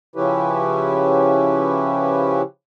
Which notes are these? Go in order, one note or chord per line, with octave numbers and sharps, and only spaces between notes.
C#3 F3 C#4 E4 G4 B4